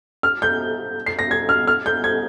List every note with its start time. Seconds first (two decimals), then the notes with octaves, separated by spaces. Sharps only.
0.23 F6
0.42 G6
1.06 C7
1.19 A#6
1.31 G#6
1.49 F6
1.67 F6
1.86 G6
2.04 G#6